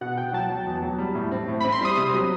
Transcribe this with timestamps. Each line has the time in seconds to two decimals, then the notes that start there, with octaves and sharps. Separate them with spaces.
0.01 B2 F#5
0.17 B2 G5
0.33 F#3 A5
0.50 F#3
0.67 E2
0.82 F#3
0.98 G3
1.15 A2
1.31 C4
1.48 A2
1.60 C4 B5
1.72 C6
1.81 G3 D#6
1.97 C3 D#6
2.13 F#3 D#6